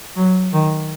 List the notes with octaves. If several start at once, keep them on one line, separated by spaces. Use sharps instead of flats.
F#3
D#3